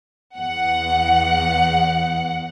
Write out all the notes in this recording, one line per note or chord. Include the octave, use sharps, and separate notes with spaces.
E2 F#5